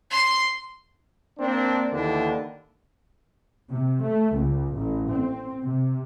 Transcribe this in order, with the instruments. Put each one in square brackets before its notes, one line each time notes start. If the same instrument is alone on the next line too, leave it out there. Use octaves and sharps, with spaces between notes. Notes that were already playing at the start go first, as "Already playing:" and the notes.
[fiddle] C6
[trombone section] A#3 C4 D4
D#2 D3 E3 D4
[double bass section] C3
A3
C#2
A1
C4
C3